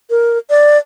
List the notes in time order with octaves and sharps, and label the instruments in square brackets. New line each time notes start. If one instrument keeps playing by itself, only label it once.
[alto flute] A#4
D5